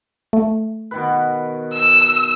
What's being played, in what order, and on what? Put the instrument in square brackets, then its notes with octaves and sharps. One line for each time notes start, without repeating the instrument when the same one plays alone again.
[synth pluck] A3
[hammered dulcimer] B2 D#3 B4
[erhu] E6